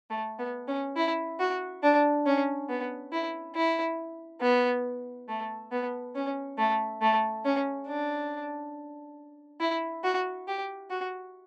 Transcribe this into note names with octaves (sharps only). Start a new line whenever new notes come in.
A3
B3
C#4
E4
F#4
D4
C#4
B3
E4
E4
B3
A3
B3
C#4
A3
A3
C#4
D4
E4
F#4
G4
F#4